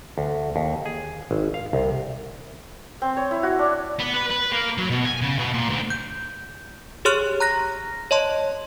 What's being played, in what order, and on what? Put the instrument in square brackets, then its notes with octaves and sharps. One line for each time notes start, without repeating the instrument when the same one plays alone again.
[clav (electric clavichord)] D2
D#2
G#4
G#1
F5
C2
[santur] C4
C#5
E4
F#4
D4
[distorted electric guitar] B3
B4
B4
A#3
F#3
B2
G#5
C#3
B2
A#2
D2
[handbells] G6
G4 G#4 C#5 C6 F6 F#6
A#5 F#6 A#6
C#5 D#5 A5 C6